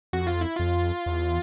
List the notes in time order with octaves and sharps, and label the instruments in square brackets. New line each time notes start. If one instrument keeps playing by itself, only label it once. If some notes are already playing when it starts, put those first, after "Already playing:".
[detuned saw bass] F2 [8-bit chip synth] F#4
[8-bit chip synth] F4
E4
[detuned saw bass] F2 [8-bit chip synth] F4
[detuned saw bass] E2